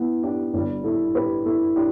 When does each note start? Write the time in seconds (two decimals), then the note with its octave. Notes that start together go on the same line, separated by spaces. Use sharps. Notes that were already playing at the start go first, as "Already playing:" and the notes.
Already playing: B3 E4
0.23 D4 G4
0.53 G1 G2 G3 D4 G4
0.84 E4 A4
1.15 G4 B4
1.45 E4 A4
1.76 D4 G4